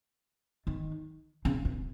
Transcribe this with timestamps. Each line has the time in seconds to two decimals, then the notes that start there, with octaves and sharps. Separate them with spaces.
0.67 D#3
1.45 C#3
1.65 C3